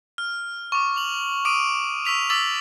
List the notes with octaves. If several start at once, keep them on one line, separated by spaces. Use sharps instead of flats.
F6
C#6 D6
F7 F#7
D6 D#6 D7 D#7 F7
C#6 E6 B6 F7
D6 E6 A6 B6 F#7